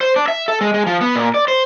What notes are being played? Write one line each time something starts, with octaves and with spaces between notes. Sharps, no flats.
C5
D4
E5
A4
G#3
G#3
F3
B3
A#2
D5
C5